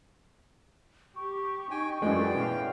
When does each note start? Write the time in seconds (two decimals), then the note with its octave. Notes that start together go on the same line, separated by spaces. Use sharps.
1.16 G4 C#6
1.71 D#4 G5 G#5
2.02 F#2 E3 G#3 A3 A4 D5 G5
2.37 B2 C#4 F5